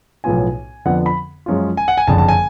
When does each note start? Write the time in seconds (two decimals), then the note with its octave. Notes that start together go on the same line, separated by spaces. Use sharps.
0.24 B1 A2 F3 B3 F4 G#5
0.85 F2 D3 F3 B3 F#5
1.06 B5
1.46 F#2 F3 G#3 C#4 F4
1.77 G#5
1.88 F#5
1.98 G#5
2.07 F#1 F2 D3 A5
2.18 A5
2.28 G#5